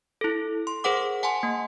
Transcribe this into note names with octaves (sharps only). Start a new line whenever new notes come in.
E4 A4
C6
G#4 A#4 C5 F#5 D6
F#5 G#5 A5 C6
A#3